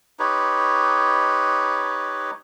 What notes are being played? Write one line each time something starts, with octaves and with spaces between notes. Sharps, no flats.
D#4 G4 B4 C#5